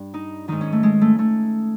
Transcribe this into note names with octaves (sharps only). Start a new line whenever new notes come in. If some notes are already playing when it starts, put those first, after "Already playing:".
Already playing: G2
D#4
G#2 D#3 D#4
C#4
A3
G#3
A3
A3